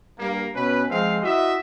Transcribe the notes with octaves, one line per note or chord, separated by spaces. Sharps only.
G2 A#3
B2 C#4 B4
F3 G#3 C4 F5
E4 F#4 D#5 E5